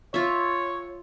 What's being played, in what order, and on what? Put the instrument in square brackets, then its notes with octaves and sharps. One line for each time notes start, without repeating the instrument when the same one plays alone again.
[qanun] F4 E5 [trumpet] C#5